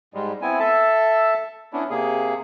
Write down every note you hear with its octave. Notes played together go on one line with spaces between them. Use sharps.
G#2 G3 G#3
B3 C4 E4 G#5
A4 E5 A5
B3 C#4 D4 E4
C3 A#3 G#4